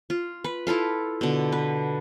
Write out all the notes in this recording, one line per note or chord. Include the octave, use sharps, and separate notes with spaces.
F4
B4
E4 F4 A4 F5
B2 D3
B4